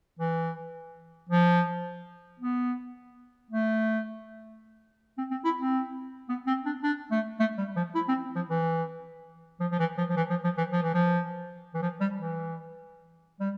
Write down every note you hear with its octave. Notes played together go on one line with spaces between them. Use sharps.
E3
F3
B3
A3
C4
C4
E4
C4
B3
C4
D4
D4
A3
A3
G3
F3
E4
C4
F3
E3
F3
F3
E3
F3
F3
E3
F3
F3
E3
F3
E3
F3
E3
F3
G3
E3
G3